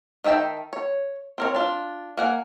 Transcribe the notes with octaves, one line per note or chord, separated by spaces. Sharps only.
D#3 D#4 E5 G5 A5
C#5
C4 A#4 C#5
D4 F4
A#3 F#5 G#5